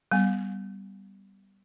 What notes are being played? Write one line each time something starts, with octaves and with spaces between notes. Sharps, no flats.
G3 B3